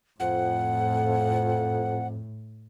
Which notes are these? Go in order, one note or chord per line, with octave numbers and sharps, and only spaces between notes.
F2 A2 F#5